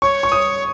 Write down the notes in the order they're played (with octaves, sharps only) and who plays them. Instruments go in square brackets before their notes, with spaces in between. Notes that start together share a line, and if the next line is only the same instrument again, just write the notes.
[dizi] C#5 [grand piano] C#6
[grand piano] C#6
D#6